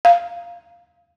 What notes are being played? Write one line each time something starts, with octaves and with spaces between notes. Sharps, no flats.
F5